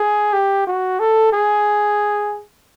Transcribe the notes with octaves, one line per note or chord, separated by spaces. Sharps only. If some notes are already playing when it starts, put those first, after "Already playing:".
Already playing: G#4
G4
F#4
A4
G#4